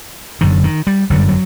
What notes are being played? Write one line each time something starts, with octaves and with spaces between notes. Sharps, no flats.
F#1 F#2 D3 D#3
D#3
G3
G1 F#2 D3 F#3
G3
F#3